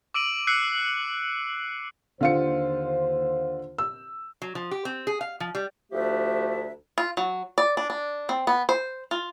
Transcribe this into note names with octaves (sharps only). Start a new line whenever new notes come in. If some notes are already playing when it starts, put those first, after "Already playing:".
D6 E6 D7 D#7 F#7
E6 F#6 C7 C#7
D#2 D3 F4 C5 C#7
E6
F#3
F3
G4
C4
G#4
F5
F3
G3
D2 F3 A3 D4 G4 E5
F4
F#3
D5
D4
D4
C4
B3
C5
F4